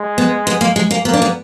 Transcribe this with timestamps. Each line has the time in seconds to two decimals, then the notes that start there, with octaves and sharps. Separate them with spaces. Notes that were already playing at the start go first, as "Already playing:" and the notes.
Already playing: G#3
0.18 B3
0.47 B3
0.61 A#3
0.76 G#3
0.91 A#3
1.05 A#3 B3
1.14 D4
1.22 B3